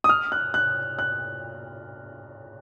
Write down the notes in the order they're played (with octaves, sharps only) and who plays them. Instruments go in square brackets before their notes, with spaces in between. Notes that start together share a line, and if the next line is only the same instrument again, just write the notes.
[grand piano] D#6
F6
F#6
F#6
F#6